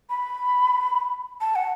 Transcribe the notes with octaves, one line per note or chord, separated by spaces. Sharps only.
B5
A5
F#5